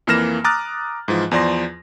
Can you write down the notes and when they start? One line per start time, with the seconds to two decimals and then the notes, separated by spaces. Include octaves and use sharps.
0.07 F2 E3 A#3 F6 A#6 E7
0.44 A#5 D6 D#6 F6 F#6 A6
1.08 G#2 E3 F3
1.31 E2 F3 D5 C6 A#6